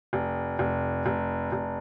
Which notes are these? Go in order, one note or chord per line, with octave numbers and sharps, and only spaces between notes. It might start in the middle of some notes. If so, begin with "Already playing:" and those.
F1
F1
F1
F1